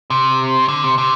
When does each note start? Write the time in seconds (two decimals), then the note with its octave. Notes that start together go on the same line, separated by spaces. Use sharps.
0.10 C3
0.68 D3
0.84 C3
0.98 C3